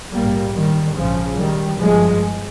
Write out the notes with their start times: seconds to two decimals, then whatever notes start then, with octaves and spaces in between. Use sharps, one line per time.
0.12 A#1 G#2 G3 A#3
0.55 D#3 G3
0.97 A#1 G#2 C#3 F3
1.39 D#3 G3
1.81 G1 G2 F3 G#3